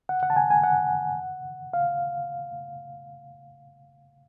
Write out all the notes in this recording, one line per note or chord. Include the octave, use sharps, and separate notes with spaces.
F#5
F#5
A5
G#5
G#5
F#5
F5